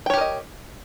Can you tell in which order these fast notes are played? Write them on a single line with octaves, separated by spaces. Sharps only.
G5 C#5 G4 A#4 D#5